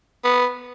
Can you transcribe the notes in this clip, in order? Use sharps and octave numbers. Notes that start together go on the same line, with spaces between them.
B3